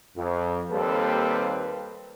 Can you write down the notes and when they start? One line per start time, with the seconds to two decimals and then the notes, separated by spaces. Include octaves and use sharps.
0.16 F2
0.71 D#2 G3 A#3 C4 A4 B4